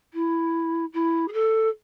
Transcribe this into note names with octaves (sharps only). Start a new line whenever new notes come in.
E4
E4
G#4
A4